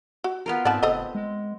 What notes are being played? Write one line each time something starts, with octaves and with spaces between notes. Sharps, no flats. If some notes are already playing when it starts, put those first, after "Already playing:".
F#4
B3 F4 A#4
G#2 B3 C4 D5 F#5 A5
F1 A4 C5 D#5
G#3